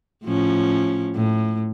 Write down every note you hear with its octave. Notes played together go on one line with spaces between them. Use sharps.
A2 F3 C#4
A2